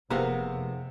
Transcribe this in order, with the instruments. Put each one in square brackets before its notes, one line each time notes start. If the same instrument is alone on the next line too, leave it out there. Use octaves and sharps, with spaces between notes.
[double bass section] F1 [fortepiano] C3 [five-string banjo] A#3 B3 A#4 [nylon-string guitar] G#4 F5 F#5